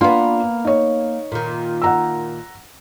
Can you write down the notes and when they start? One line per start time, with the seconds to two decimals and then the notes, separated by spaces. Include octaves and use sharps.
0.01 A#3 B3 D4 F4 C6
0.65 D#4 C#5
1.32 A#2 D#3
1.82 F#5 A#5 E6